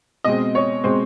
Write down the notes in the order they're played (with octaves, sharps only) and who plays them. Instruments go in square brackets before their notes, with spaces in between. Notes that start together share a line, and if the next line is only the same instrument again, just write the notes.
[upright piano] B2 G#3 C4 D#5
C#5
B2 G#3 C4 C5